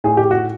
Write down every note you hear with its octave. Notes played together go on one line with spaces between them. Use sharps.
A2 G#4
G4
F#4